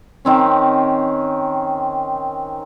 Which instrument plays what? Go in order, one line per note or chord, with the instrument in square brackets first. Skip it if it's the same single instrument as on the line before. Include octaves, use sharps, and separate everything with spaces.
[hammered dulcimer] D#3 C4 C#4